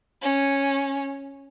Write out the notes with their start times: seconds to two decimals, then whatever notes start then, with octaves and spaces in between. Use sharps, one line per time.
0.23 C#4